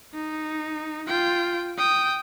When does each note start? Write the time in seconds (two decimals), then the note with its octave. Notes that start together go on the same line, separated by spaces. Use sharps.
0.14 D#4
1.08 F4 G5
1.78 G5 D#6